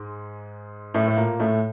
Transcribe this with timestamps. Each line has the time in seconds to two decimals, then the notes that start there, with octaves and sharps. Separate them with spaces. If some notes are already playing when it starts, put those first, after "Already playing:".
Already playing: G#2 G#3
0.94 A2 A3
1.08 A3
1.17 A#2 A#3
1.40 A2 A3